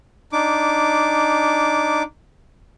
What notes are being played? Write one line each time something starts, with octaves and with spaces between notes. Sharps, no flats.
D4 D#4 D6